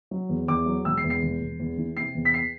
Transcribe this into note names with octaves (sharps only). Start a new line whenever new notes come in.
F#3
E2
E2 D6
F#3
E1 E6
C7
E2
C7
E1
E1
E2
E3
C3 C7
E2
B6
C7